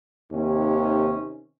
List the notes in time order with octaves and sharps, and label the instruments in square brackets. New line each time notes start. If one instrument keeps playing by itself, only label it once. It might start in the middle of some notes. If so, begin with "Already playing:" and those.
[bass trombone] D#2 [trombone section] C3 D#3 C#4